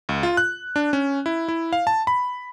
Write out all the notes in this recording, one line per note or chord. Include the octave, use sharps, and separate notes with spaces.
C#2
F4
F#6
D4
C#4
E4
E4
F5
A5
B5